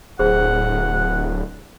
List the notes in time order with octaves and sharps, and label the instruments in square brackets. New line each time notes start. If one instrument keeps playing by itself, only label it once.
[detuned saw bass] D1 [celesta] G#4 C5 [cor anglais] F#5